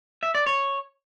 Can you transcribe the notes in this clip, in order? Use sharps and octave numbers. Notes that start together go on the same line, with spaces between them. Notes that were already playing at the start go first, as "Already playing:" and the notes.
E5
D5
C#5